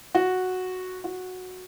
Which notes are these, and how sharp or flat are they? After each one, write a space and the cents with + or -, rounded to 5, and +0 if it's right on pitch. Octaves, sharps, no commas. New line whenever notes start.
F#4 -5
F#4 -10